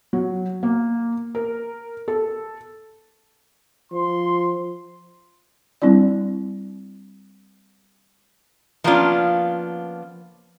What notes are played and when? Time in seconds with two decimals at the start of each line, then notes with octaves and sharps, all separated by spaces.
0.13 F#3
0.63 A#3
1.35 A#4
2.08 A4
3.92 F3 C6
5.82 G3 C4 D4 E4 D5
8.84 F3 A#3 B3 C#4 D4 F4